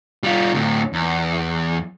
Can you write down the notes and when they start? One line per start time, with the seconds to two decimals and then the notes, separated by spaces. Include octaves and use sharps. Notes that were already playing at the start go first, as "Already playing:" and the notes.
0.23 G3 F4
0.54 D2 A2
0.93 E2